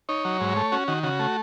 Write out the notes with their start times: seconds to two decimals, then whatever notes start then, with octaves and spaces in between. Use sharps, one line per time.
0.09 D#4 C#5
0.25 F#3
0.41 G#2
0.56 A3
0.72 C#4 F#4
0.88 D#3 F#4
1.03 C#3 F#4
1.19 A3